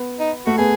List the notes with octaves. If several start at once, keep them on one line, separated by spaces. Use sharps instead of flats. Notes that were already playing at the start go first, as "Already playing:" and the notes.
Already playing: B3
D#4
A3 F#4
B3 G#4